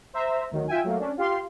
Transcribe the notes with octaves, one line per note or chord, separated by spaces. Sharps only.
C5 E5 A#5
D2 D#3 F#3
F4 E5 G5 G#5
F#3 A3 A#3
C#4 D4
F4 G4 F5 C6